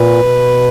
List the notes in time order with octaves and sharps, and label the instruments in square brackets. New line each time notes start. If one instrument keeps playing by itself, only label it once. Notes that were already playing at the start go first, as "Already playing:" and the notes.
Already playing: [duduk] A#2 [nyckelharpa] B4
[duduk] B2